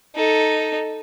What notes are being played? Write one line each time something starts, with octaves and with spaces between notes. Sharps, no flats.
D#4 A4